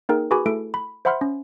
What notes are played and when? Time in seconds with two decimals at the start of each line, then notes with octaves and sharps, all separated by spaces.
0.09 A#3 D#4 G#4 A#4 G5
0.31 F#4 G#4 B4 G#5 B5 D6
0.46 A3 E4 A4 D7
0.74 B5
1.05 C5 E5 F#5 B5 C6 F6
1.21 C#4